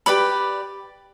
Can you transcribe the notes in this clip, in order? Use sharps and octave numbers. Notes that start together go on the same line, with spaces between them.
G4 B4 D5 B5